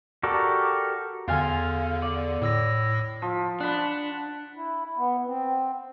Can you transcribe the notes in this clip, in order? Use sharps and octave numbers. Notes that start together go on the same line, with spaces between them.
F#4 G4 A4 A#4 D5
E2 D3 F4 F5 G#5
D5
A2 E6 A#6
F3
D4 F#5 B5
E4
B3
C4